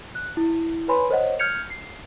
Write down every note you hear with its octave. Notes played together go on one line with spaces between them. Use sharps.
F#6
E4
B4 C#5 G#5 B5 C6
A#4 C5 C#5 D#5 F#5
F6 G6 G#6 C#7 F7
C7